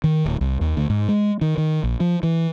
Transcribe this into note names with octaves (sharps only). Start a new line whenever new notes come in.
D#3
D1
C2
D#2
D2
G#2
G#3
D#3
D#3
A#1
F3
E3